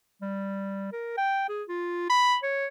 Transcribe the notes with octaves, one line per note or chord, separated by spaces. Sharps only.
G3
A#4
G5
G#4
F4
B5
C#5